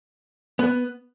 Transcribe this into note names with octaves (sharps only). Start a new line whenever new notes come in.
B3